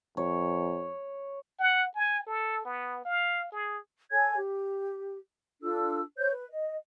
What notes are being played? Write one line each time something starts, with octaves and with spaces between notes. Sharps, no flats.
F2 C#5
F#5
G#5
A4
B3
F5
G#4
A4 C#5 G#5 G#6
G4
D4 F4 A4 E6
C5 C#5 G6
B4
D#5